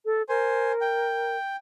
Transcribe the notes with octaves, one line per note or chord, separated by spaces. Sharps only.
A4
A#4 C5 G#5
G5